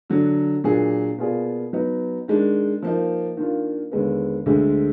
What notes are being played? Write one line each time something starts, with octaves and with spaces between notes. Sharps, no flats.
D3 F#3 D4
A#2 F#3 D4 G#4
B2 A#3 F4 G#4 D5
F#3 B3 D#4
D#3 G#3 D4
F3 A#3 D#4
D#3 A#3 D4 F4
D#2 D3 G#3 B3
D2 D3 G#3